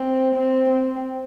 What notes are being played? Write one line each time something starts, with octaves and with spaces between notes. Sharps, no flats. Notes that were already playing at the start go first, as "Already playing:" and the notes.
Already playing: C4
C4
C4